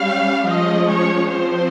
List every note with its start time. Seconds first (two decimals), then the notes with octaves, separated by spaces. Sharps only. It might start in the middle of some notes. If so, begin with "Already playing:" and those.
Already playing: G3 C#4 F5
0.46 F3 G#3 C#4 D#5
0.89 C#5
1.30 F3 C4 C5